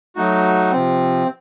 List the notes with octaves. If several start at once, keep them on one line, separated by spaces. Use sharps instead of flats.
F#3 A3 D#4 F#4
C3 F3 C4